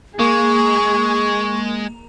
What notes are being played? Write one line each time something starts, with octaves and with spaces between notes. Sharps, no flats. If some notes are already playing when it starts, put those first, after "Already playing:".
G#3 A#3 G#4 C#6